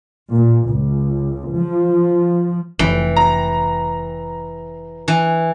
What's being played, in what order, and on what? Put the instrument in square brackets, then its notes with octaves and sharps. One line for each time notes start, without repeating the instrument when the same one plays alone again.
[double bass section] A#2
C#2
F3
[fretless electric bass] F1 [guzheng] E3 G5
[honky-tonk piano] A#5
[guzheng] E3